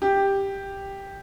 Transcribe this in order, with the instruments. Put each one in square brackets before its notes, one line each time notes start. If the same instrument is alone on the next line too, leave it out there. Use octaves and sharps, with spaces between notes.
[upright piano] G4